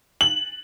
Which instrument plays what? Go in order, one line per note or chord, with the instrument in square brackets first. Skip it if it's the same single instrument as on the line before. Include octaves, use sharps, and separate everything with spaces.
[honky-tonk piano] F#7